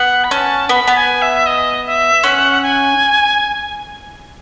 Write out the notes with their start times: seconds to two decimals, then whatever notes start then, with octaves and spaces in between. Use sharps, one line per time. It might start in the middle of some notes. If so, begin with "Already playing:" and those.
Already playing: B3 F#5
0.24 B5
0.31 C#4 A5
0.69 B3 B5
0.88 B3
0.95 G#5
1.22 E5
1.46 D#5
1.86 E5
2.23 C#4 F#5
2.63 G#5